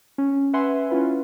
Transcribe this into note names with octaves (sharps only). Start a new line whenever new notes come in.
C#4
B4 E5 F#5 G#5 C6
C#4 E4 F4 B4